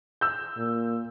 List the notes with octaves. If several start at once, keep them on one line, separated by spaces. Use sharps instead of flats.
E6 G6
A#2